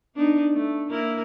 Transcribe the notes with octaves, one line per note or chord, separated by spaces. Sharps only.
B3 D4 D#4
A3
A#3 E4 A#4